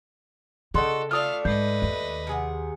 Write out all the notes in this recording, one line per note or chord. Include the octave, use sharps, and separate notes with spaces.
C#3 F#4 G#4 A4 D5 D#5 G5 C6
A3 D4 F4 A4 D5 F5 D#6 F6
G#2 B4 D#5 G6 C7
D#2
C3 G#4 F#5